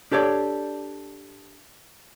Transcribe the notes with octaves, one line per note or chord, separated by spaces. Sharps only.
D4 G4 A4 C#5 D5